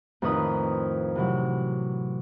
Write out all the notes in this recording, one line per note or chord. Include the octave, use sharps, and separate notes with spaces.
F2 A2 D#3 F4 B4 D#6
C3 E3 F#3